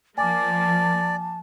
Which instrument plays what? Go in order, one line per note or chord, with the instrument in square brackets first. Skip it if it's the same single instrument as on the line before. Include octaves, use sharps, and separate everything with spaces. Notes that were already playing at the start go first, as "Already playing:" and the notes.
[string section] F3 A#3 [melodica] D5 [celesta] G#5 D6 [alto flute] A5